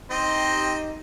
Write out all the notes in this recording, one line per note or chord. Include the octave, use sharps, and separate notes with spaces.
C4 D#4 G4 C5 D#5